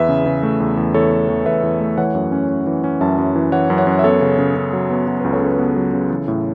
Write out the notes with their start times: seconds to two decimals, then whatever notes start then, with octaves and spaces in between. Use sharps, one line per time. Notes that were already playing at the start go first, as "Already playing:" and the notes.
Already playing: E2 B4 E5
0.09 C#3
0.26 C#3
0.43 A3
0.60 E2
0.77 E2
0.94 E2 A4 C#5
1.11 A3
1.29 E2
1.46 E2 B4 E5
1.63 E2
1.81 A3
1.98 E3 C#5 F#5
2.15 F#2
2.32 C#4
2.49 C#4
2.67 E3
2.84 C#4
3.01 F#2 E5 A5
3.18 F#2
3.36 E3
3.52 E3 C#5 F#5
3.70 F#2
3.78 C#5 F#5
3.87 F#2
3.99 E5
4.04 B3 A4 C#5
4.21 C#3
4.39 C#3
4.56 C#3
4.73 F#3
4.90 B3
5.08 F#3
5.20 C#2 B4
5.33 A4 C#5
5.42 C#3 B4
5.59 B3 A4
5.76 F#3
5.93 C#3
6.11 E3
6.28 A2